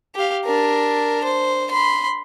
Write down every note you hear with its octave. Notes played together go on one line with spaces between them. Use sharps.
G4 F5
D4 A#4
C5
B5 C6